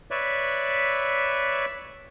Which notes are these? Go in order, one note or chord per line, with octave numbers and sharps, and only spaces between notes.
B4 C#5 D5 E5